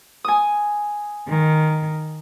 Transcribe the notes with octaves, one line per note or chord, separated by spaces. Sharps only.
G#5 D#6
D#3